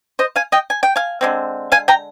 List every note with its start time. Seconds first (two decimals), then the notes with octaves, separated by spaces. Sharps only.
0.19 C5 D#5
0.36 F5 G#5
0.52 D#5 G5
0.70 G#5
0.83 G5
0.96 F5 G#5
1.21 D3 G#3 C4
1.72 F5 G#5
1.88 G5 A#5